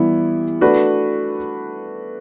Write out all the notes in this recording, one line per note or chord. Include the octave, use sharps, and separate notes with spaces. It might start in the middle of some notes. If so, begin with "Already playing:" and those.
Already playing: E3 G3 B3 E4
A3 D4 F#4 B4